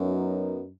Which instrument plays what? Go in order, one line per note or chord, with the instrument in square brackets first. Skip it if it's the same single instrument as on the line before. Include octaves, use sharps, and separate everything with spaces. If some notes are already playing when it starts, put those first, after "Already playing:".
Already playing: [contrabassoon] F#2 [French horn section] F#3 B3 D#4 A#4